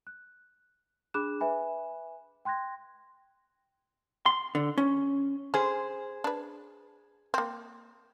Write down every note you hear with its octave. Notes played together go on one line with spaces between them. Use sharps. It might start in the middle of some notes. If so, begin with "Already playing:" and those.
F#6
D4 G#4 B5 D6 F#6 E7
B4 E5 G#5 B5
G5 C6 F#6 G#6 A#6
C6
D3
C#4
C#4 G#4 C5
D4 B4
A#3 C4